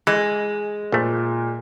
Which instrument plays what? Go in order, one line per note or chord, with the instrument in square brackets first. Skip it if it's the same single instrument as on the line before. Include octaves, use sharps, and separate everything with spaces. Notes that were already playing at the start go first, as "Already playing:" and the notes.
[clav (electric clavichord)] E3 [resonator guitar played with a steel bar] G#3
[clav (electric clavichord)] A#1 A3 [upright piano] A#2